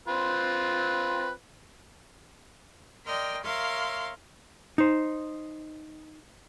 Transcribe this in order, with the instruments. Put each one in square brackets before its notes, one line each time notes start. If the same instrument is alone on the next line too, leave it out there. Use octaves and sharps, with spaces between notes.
[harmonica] C4 F4 B4
[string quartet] A#4 D5 D#5 G5 C6 F6
A#4 C#5 E5 F5 C6
[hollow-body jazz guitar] D#4 C5